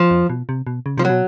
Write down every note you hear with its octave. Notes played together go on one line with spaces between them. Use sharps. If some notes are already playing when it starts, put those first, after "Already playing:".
Already playing: F3
F2
B2
C3
B2
C#3
C3 F3
B2 F#3